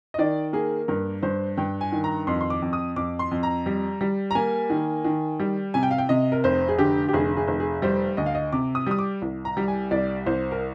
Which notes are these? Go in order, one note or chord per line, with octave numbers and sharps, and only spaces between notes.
D#5
D#3 D5
A#3 G#4
G2 A#4
G2 C5
G2 G5
G#5
D#3
A#5
F2 C6
C6
D6
F2
D#6
F2 D6
C6
F2
A#5
G3
G3
A#5
A#3 G#5
D#3
D#3
G3
C3 G#5
G5
F5
G5
C3 D#5
A#4
F1 C5
G#4
D3 G4
G4
F1 G#4
G#4
F1
G#4
G3 C5
D2 D#5
F5
D#5
C3 D6
D#6
G3 D#6
D6
C2
A#5
G3
G#5
C2 D5
C2 C5
A#4